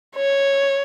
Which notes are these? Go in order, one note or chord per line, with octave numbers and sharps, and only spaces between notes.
C#5